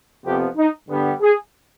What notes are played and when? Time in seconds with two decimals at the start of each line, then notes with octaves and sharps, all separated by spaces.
0.24 F2 C3 F3 B3 G4
0.57 D#4
0.89 G2 D3 G3 B3
1.21 G#4